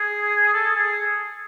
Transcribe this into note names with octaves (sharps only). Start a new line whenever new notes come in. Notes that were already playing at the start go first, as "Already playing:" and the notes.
Already playing: G#4
A4
G#4